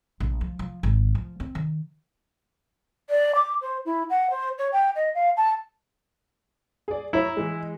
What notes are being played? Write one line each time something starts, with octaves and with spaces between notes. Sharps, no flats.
A#1
F3
F3
G#1
F3
C4
D#3
D5
D6
C5
E4
F#5
C5
C#5
G5
D#5
F5
A5
G#4 D5
E4 C#5 A#5
E3 G#3